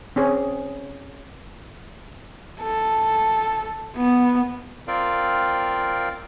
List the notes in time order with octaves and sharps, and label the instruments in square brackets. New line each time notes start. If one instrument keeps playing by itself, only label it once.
[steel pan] C4 C#4 G#4
[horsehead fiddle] A4
B3
[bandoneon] C4 F4 A#4 D5 F5 G5